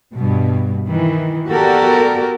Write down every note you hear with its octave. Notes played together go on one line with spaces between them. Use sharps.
G2 B2
D#3 E3
B3 F#4 G4 A4 A#4 D5